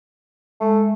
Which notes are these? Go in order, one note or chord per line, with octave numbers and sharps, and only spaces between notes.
G#3 A3